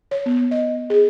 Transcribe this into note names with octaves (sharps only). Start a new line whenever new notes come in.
C#5
B3
D#5
G#4